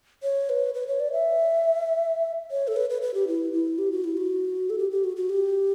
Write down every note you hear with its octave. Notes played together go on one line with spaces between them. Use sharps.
C#5
B4
B4
C#5
D5
E5
C#5
A4
B4
B4
B4
G4
E4
E4
G4
F#4
E4
F#4
A4
G4
G4
F#4
F#4
G4